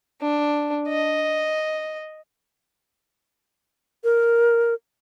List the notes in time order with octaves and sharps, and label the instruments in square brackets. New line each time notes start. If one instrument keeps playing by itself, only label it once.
[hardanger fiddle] D4
D#5
[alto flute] A#4